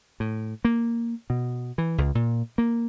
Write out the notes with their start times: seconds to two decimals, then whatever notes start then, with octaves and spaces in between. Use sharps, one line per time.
0.20 A2
0.65 A#3
1.30 B2
1.78 E3
1.98 C#2
2.15 A#2
2.58 A#3